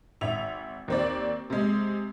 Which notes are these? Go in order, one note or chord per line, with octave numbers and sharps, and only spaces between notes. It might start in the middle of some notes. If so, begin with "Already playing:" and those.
G#1 E5 F7
D#2 C4 D5
C3 G#3